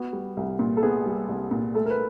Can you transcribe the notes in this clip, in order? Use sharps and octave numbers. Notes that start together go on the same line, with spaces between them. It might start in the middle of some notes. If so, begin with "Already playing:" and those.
Already playing: B3 F#4
G3
C2
A#2
A4
B3 G#4
G3
C2
A#2
A3 A4
A#4
B4